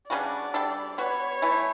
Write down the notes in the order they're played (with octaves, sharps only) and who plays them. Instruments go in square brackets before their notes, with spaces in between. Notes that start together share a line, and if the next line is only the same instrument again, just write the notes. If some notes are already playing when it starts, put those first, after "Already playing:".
[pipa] C#3 G3 D4 F#4 [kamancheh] D5
[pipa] G3 D4 A4
[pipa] B3 F#4 B4 [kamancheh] C#5
[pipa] E3 A3 E4